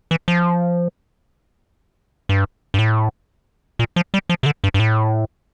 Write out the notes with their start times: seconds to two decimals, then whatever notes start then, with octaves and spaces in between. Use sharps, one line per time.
0.11 E3
0.28 F3
2.29 G2
2.74 G2
2.79 A2
3.79 A#2
3.96 F3
4.14 G3
4.29 F3
4.43 C3
4.46 D3
4.64 G2
4.74 G2
4.80 A2